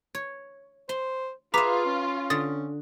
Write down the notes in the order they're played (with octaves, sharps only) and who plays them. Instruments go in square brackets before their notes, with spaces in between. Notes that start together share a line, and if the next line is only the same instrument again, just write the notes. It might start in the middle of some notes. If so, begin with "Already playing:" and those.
[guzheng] C#5
[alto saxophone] C5 [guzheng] C6
[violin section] F4 [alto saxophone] G#4 [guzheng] B4 E5 [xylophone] A#5 D6 B6
[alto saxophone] C#4
[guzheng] D3 [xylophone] D#6 A6